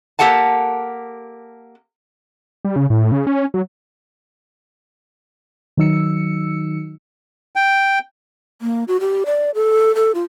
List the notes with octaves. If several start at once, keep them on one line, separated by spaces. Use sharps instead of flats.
A#3 G4 A4 F#5 A5
G3
C#3
A2
C#3
C#4
F#3
D#3 F#3 D#4 E6 C#7
G5
A#3
F#4
G4
D5
A4
A4
F4